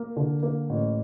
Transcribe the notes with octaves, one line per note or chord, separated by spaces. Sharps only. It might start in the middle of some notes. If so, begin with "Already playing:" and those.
Already playing: A#3
D3
A#3
A1